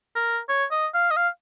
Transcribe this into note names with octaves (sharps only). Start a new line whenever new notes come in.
A#4
C#5
D#5
F5
D#5
F5